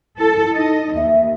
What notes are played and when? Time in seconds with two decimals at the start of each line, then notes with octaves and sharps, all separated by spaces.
0.19 E4 A4
0.56 D#4 D#5
0.96 D#2 E5